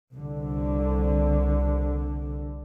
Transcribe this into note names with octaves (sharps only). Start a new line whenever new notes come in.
C2 D3